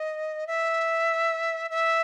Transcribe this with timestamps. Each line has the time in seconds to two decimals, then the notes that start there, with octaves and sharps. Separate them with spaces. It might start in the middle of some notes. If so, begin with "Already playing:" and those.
Already playing: D#5
0.47 E5
1.71 E5